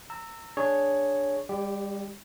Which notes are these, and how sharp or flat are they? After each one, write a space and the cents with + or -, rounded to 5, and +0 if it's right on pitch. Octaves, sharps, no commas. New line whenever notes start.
A#5 -30 E6 +0
D4 +0 G#4 +0 C#5 +0
G3 +40 G4 +0 D5 -20